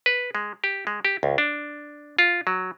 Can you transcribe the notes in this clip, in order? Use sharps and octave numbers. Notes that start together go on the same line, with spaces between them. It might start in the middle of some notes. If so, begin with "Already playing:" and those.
B4
G#3
G4
G#3
G4
C#2
D4
F4
F#3